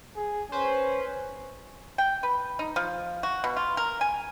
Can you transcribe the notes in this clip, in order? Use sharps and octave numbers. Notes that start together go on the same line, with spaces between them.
G#4
C#4 B4 C5
G5
B4
D#4
F3
F#4
B2
F4
A#4
G#5